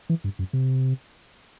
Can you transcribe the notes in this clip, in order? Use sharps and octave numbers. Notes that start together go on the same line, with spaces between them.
E3
G2
F#2
C3